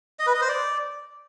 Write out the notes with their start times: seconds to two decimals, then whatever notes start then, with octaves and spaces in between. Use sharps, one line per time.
0.19 D#5
0.27 B4
0.34 D#5
0.41 C5
0.49 D5